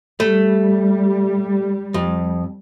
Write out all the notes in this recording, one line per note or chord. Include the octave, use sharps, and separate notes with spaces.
G3 A3
F2